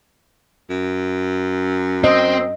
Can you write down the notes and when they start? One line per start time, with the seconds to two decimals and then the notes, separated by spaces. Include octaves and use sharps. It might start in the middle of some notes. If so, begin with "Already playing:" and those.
0.70 F#2
2.04 C4 D#5